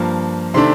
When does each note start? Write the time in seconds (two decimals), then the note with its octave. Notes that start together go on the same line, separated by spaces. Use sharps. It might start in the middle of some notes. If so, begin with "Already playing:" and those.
Already playing: G2 F3 A#3
0.54 C3 D#3 A3 D4 C6